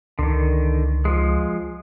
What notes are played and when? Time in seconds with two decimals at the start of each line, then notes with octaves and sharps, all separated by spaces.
0.19 C#2 D3 D#3
1.05 F3 G#3